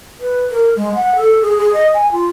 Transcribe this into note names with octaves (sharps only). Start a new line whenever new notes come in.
B4
A#4
G#3
F#5
A4
G#4
G#4
D#5
G#5
F4